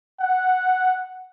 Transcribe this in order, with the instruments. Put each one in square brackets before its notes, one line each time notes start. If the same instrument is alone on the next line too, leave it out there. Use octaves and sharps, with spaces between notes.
[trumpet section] F#5